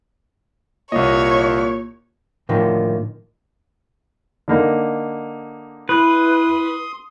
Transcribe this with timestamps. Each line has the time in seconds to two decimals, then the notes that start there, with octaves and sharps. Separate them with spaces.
0.92 C2 A#2 C#5 D#5
2.49 A2 D3 D#3 F3 A#3
4.48 D3 A#3 D#4
5.89 E4 B4 C6 D#6